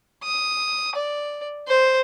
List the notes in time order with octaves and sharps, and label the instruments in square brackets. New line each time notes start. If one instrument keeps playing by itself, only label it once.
[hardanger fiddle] D#6
D5
C5